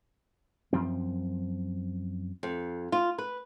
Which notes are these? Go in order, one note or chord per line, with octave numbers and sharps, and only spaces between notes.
F#2 F3 C4
F2
F4
B4